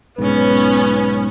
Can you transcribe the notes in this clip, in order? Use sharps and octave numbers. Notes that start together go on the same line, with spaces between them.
B1 G#2 B3 C#4 B4